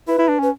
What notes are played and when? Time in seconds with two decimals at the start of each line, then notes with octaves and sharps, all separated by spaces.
0.08 E4 B4
0.18 E4
0.29 D4
0.39 C#4 B4